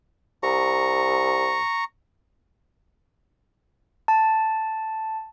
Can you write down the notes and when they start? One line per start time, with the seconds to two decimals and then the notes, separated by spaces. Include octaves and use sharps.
0.43 C2 A#5 C#6
4.08 A5